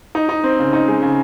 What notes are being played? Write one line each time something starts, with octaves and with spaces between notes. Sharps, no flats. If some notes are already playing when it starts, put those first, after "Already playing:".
D#4
D#4
C4
C#3
D#4
G#3
C#3